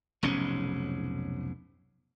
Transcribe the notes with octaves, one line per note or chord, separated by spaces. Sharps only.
F1 B1 G#2 C#4